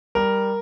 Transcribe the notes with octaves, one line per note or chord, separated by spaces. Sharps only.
G3 A#4